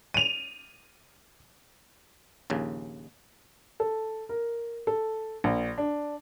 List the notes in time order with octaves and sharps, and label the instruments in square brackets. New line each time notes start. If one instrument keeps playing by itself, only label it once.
[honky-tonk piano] D#7 F7
[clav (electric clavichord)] A#1 D#2 C#3
[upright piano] A4
A#4
A4
A#1
D4